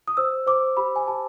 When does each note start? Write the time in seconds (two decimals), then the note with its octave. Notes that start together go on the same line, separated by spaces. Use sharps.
0.08 D#6
0.17 C5 E6
0.47 C5 D6
0.77 G4 B5
0.96 G#5
1.08 G4 A5